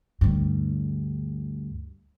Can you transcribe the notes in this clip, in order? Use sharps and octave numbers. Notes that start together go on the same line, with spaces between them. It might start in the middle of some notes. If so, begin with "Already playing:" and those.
D2 G2